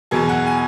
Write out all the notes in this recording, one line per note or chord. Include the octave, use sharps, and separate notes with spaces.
E2 B2 F#3 G#4
F#5
G#5